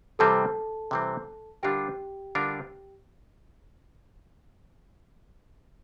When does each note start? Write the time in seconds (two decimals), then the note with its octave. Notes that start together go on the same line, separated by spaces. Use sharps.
0.19 C3 E3 G3 C4 A4 A5
0.91 C3 E3 G3 C4
1.63 D3 G3 D4 F4 G4 A#4 G5
2.35 D3 G3 D4 F4 A#4